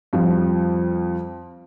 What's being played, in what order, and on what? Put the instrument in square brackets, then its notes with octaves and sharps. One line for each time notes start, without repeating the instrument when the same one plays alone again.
[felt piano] F2 F3 G3 F5